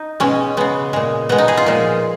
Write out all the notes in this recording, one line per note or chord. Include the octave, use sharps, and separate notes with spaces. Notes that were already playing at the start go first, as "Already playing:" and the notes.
Already playing: D#4
B2 G#3 C#4
C#3 G#3 B3
A#2 G#3
B2 G#3 B3
D#4
G#4
F4
A#2 F3 G#3